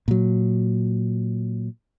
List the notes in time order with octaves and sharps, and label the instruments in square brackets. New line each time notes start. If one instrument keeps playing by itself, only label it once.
[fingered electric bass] A#2 F#3